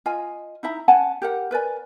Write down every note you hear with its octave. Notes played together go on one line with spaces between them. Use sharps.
F4 D#5 G#5
D#4 E4 E5 A#5
C#4 F#5 G#5 A5
G4 A#4 F#5
A#4 B4 D5 G#5